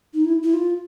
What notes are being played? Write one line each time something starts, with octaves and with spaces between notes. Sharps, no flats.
D#4
E4
E4
F4